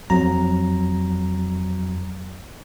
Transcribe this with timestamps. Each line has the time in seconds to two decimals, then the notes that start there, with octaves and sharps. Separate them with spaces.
0.10 F2 F#3 A#5